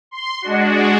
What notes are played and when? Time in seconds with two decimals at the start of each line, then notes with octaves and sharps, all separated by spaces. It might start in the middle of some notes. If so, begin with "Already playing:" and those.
0.11 C6
0.42 G#3 D4 F#4